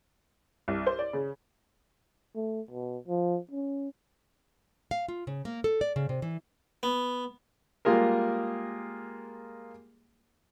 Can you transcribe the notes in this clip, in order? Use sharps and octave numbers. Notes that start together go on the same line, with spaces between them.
C2
C5
D5
C#3
A3
B2
F3
C#4
F5
F4
C#3
A#3
A4
D5
C#3
C3
E3
B3
G3 G#3 A#3 F4 G#4 A#4